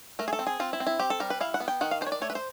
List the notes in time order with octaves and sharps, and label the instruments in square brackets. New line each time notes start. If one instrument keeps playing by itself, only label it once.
[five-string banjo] A3 A#4
G#4
A4
C4
G#4
C4 F4
E4
C4
E4
C4 G4
A4
G3 A#4
B4
E4 F5
F#5
B3
G5
D#3 F#5
F5
D4 C5
C#5
D5
A3 C#5
B4
C5